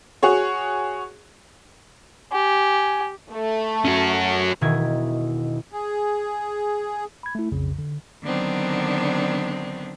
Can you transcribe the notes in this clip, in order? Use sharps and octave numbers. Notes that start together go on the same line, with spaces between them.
F#4 G#4 C#5
G4 G#5
A3
C#4 F#4
E1 B2 D#3 E4 D#6 G#6
G#4
B5 G#6
A3 E4
B1 F2 C#3
D3
D3 D#3 F#3 B3 C4 D4